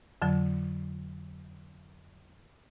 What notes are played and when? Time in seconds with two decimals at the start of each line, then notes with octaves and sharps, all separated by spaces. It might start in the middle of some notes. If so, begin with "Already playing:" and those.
0.22 F2 D3 F#3